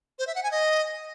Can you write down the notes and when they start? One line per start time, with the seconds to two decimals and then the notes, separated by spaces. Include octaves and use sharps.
0.19 C5
0.27 E5
0.35 F#5
0.43 G#5
0.51 D#5